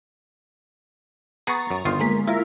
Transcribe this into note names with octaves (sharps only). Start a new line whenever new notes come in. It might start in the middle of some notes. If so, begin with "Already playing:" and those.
B3 G#4 A#5 C#6 A6
F#2
G1 D#3 F4 C6
G#3 A#3 B6
E4 F4 A#4